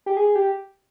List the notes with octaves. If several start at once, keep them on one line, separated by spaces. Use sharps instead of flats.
G4
G#4
G4